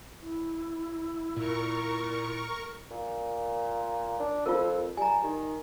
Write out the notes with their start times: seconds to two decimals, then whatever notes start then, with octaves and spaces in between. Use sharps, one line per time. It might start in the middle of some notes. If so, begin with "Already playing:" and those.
0.21 E4
1.36 A#2 A#4 C#6
2.91 A#2
4.20 D4
4.46 F2 F4 A#4
4.97 G3 G#5 A#5
5.24 D#3